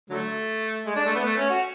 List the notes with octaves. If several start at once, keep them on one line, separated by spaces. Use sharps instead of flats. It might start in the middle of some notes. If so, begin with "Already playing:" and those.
D3 F#3 A3
G#3
D4
A3
B3
A3
C#4
F#4